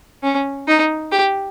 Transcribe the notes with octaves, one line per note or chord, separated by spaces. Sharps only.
C#4
D#4
G4